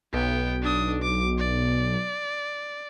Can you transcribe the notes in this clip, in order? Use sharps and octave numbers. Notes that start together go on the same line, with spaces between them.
B1 B3 G5
D4 D#6
D6
D5